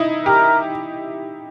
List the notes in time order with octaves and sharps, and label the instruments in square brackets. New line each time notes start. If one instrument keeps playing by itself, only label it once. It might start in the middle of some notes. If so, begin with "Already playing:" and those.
Already playing: [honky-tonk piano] D#4 E4
[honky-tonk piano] G4 [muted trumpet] A#4